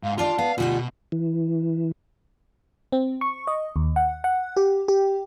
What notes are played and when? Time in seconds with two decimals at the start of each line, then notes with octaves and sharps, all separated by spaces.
0.03 G#2 F5
0.18 D#2 D4 F4 D5 A5
0.39 B3 F5
0.58 D2 B2 G3 B3 F4 F#5
1.12 E3
2.92 C4
3.21 C#6
3.47 D#5
3.76 D#2
3.96 F#5
4.24 F#5
4.57 G4
4.88 G4